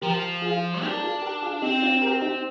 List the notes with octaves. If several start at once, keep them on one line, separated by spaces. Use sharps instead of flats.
F3 G4 A#4
F4 G#4
D4 D#4 G4
A#4
F4 G#4
G4 A#4
F4 G#4
C4 D#4 G4
D4 F4
G4 A#4
D#4 G4